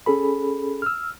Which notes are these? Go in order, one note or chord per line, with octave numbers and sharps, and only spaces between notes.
C#4 G#4 A4 B5
E6 F6